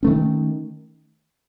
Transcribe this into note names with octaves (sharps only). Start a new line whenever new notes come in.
D#3 A3 C#4